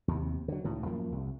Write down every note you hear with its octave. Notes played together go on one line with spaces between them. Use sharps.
D#2 C3
D3 F#3
C#2 A2 D#3
F#2 F3 A#3
C2